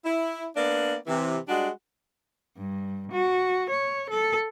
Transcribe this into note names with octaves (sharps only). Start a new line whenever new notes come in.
E4
A#3 B3 D4 D5
C3 E3
G3 G#3 D4 F#4
G2
F#4
C#5
A4